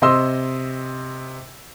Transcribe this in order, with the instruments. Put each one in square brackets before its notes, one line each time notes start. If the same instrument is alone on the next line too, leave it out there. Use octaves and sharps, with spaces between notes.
[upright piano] C3 D#5 C6 E6